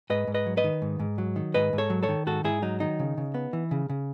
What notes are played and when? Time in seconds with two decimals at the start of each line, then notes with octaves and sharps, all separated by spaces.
0.10 G#2 B4 D#5
0.28 G#2
0.34 B4 D#5
0.46 F#3
0.57 B4 D#5
0.64 D#3
0.82 G#2
1.00 G#2
1.18 F#3
1.36 D#3
1.54 G#2 B4 D#5
1.73 G#2
1.78 A4 C#5
1.90 F#3
2.03 A4 C#5
2.08 D#3
2.26 G#2 F#4 A4
2.44 G#2 E4 G#4
2.62 F#3 D#4
2.80 D#3 D#4
3.00 C#3
3.18 C#3
3.34 B3
3.53 E3
3.71 C#3
3.89 C#3